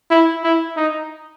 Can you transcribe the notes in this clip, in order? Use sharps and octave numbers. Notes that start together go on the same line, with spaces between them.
E4
E4
D#4